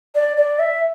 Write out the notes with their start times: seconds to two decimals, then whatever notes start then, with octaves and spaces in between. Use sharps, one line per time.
0.15 D5
0.37 D5
0.59 E5